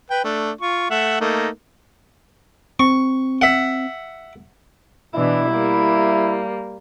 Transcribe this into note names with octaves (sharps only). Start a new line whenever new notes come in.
B4 G5
A3 D4
F4 C#6
A3 E5 F#5
A3 A#3 D#4
C4 C#6
E5 F#5
B2 E3 D4 E4
G3 A#3